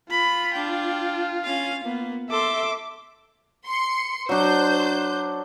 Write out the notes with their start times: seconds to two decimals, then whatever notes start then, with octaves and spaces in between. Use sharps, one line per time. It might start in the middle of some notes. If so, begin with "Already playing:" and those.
0.10 F4 B5
0.54 D4 G5
1.44 C#4 F5
1.84 A#3 B3
2.30 A4 E5 C6 D6
3.66 C6 C#7
4.29 F#3 D4 C5 G6